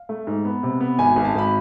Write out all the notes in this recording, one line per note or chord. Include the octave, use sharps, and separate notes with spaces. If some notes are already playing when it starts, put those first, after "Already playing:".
Already playing: F5
A3
G#2
B3
C3
B3
G#1 G#5
G#1
A5
G#1 B5